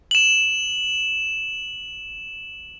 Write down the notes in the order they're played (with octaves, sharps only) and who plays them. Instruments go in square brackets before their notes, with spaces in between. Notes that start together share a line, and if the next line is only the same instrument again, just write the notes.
[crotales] E7 F#7